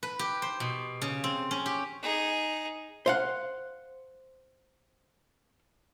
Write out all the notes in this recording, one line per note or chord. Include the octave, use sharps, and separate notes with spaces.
B4
G4
C5
B2
C#3
C4
C#4
G4
D#4 G#4
C5 F5 F#5